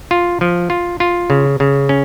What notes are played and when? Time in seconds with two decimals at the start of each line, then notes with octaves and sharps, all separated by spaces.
0.11 F4
0.41 F3
0.70 F4
1.00 F4
1.30 C#3
1.60 C#3
1.89 C#4